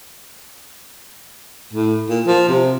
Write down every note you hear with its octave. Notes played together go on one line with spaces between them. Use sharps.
A2
A#2
F3
C3